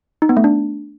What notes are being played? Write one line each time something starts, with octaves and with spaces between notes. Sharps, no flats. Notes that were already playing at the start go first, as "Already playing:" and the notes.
D#4
B3
A3
D4